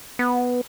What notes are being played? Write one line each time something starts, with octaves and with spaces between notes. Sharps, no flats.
B3